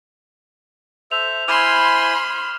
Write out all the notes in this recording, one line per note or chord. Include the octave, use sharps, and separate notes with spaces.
A4 C5 E5 F7
E4 C5 G#5 B5 C6 D6 F6 E7